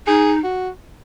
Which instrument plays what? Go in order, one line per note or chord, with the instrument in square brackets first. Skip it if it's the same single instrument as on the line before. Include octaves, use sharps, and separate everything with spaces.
[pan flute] D#4 [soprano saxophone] G#4
[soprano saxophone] F#4